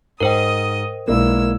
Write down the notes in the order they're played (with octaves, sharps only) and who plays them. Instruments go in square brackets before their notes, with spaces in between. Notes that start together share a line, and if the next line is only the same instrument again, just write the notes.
[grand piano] G#2 [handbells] A#4 C5 G5 [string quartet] D#5 D#6
[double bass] B1 [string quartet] G#3 E6 [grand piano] A#3 E4 D5